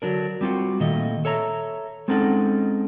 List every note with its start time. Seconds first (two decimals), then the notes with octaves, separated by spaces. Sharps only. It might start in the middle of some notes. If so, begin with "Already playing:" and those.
0.02 D3 F#3 D4 A#4
0.41 G3 C4 F4 F#4
0.80 A#2 D#3 A3 D#5
1.25 A4 C#5 E5 A#5
2.08 G#3 C4 C#4 D#4 A4 F#5